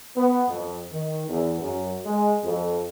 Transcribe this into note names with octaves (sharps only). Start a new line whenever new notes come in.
B3
F2
D#3
E2
F#2
G#3
F2